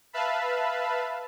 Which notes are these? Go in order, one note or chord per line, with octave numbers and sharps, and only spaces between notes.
B4 E5 F5 A5 B5